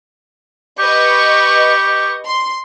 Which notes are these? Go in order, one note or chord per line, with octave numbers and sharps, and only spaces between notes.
G4 B4 D#5 C#6
C6